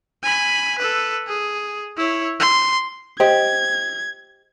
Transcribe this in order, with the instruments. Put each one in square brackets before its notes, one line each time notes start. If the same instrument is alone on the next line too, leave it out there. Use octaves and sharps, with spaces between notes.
[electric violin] G#5 B5
A4 B4
G#4
E4 C#5
C6
[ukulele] G4 [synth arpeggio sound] C5 D#5 [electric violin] G#6